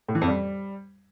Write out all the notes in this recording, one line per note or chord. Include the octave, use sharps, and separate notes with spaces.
A2
E3
F2
G3